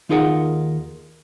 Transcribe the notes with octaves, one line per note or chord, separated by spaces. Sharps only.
D#2 D#4 F4 G#4 A#4 F#5